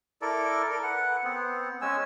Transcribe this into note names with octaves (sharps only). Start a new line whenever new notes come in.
E4 A4 A#4 D5
A4 A#4
B4 F#5
B3 C4
G#3 C#4 G#5 E6